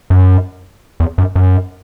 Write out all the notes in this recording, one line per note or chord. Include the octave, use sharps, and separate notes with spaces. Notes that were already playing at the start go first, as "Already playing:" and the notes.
F#2
E2
F#2
F#2